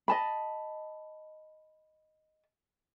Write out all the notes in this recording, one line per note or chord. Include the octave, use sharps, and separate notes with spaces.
D#5 A5 B5